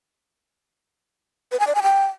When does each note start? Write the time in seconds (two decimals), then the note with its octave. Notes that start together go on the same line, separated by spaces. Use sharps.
1.52 B4
1.60 G#5
1.67 D5
1.75 G#5
1.83 G5